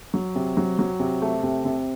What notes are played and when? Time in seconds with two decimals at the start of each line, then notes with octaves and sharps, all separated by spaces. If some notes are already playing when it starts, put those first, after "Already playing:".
0.14 F#3
0.35 C3
0.57 F#3
0.79 F#3
1.00 C3
1.22 A3
1.43 C3
1.65 C3